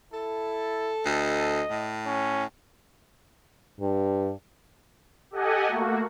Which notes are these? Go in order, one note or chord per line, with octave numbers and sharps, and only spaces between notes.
E4 A4
D2 D#5
A2
C#4
G2
G4 A4 D#5 F#5 G#5
A3 A#3 F#4